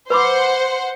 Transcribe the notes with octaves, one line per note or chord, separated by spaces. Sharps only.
B4 C5 F#5 B5 D6